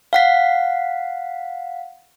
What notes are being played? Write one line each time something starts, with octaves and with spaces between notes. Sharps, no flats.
F5 F#5 B6